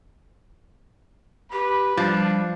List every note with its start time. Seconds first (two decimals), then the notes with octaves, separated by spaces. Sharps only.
1.52 G4 B4
1.97 F3 G3 D4